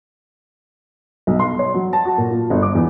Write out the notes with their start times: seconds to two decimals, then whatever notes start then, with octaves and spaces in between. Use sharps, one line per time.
1.27 B1
1.39 C6
1.59 C#5
1.74 F#3
1.93 A5
2.05 F#4
2.18 A#2
2.31 F4
2.50 G1
2.62 D6
2.75 E2